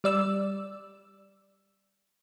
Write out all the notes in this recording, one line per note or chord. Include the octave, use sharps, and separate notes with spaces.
G3 D5 E6